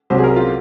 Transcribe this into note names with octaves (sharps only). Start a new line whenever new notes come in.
C2 C3 F#3 C5
G#4
A#4
F4